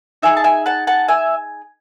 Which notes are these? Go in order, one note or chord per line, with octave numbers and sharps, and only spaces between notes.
D#4 G#4 E5 G#5
A5
E5 G#5
F#5 A5
F#5 A5
E5 G#5